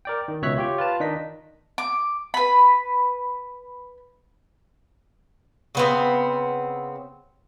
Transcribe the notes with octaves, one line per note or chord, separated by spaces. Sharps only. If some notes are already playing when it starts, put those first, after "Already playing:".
A#4 D5 G5
D#3
C#2 B2 C#5 E5 F#6 B6
F4 G4 C#5 G5
F4 B4 A5
D#3 D4 D#4 D#5 B6
D6
B4 B5
C#3 B3 C4